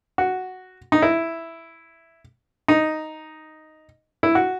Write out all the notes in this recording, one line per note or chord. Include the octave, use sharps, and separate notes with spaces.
F#4
D#4
E4
D#4
E4
F#4